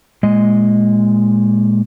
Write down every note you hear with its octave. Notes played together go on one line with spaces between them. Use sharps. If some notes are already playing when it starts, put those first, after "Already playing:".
A#2 G#3 D#5